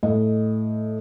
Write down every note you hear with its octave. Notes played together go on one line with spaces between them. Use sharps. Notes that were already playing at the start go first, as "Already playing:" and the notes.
A2 D#5